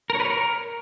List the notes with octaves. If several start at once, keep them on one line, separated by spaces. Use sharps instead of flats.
A#4
C#5
B4
C#5
A#4